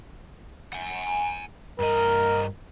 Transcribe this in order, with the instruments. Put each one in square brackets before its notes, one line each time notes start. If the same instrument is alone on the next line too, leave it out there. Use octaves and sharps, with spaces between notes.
[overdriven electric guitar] F#5 G#5
[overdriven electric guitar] G2 D#5 [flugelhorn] A#4